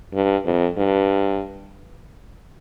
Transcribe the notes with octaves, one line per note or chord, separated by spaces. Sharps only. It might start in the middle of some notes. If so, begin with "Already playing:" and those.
G2
F2
G2